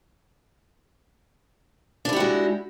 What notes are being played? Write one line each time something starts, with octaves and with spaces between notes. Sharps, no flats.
G#3 D4 E4 F#4 G4